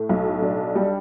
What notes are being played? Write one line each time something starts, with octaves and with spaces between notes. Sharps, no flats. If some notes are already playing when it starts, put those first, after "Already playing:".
Already playing: A2
B1
D4
G3